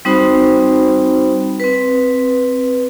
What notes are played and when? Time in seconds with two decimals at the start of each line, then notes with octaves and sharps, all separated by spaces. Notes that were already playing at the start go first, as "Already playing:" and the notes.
0.05 G3 C4 D#4 F#4 C5 B5
1.60 C4 B4